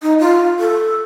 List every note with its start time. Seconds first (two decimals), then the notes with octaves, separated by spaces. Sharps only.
0.02 D#4
0.19 F4
0.59 A4